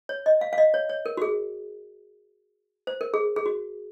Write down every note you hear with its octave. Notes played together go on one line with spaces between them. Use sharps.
C#5
D#5
F5
F5
D#5
C#5
C#5
A#4
F#4
G#4
C5
A#4
G#4
G#4
F#4